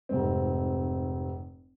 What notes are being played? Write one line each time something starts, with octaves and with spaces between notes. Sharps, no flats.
F1 G#2 C4